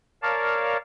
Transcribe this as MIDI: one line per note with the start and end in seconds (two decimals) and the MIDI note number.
0.22 0.77 70
0.22 0.77 73
0.22 0.77 74
0.22 0.77 77
0.22 0.77 81